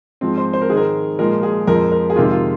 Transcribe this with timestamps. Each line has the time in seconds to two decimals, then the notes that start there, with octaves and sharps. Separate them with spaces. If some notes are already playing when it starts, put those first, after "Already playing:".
0.21 G#2 F3 G#3 C4
0.38 C5
0.53 C5
0.61 A#4
0.70 G#2 D#3 G#3 G#4
0.77 A#4
1.19 A#2 F3 G#3 A#4
1.43 G#4
1.67 F2 F3 G#3 A#4
1.92 A#4
2.10 G#4
2.16 F2 C3 D#3 G#3 F4
2.32 F4